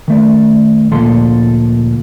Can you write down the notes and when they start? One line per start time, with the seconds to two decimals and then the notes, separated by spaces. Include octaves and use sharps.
0.08 D#3 A3 D5
0.91 D2 A#2 F3 A4 C6